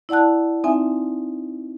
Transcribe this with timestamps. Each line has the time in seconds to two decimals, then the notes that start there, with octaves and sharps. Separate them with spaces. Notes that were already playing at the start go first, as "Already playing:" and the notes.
0.09 E4 D5 F#5 A5 F#6
0.64 C4 D#4 E5 G#5